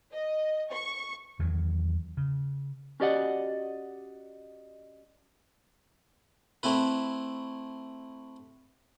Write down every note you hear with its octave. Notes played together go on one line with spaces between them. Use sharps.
D#5
C#6
E2 D#3 E3 F#3
C#3
C#4 F#4 G4 D5 D#5 F#5
A3 C4 E4 B4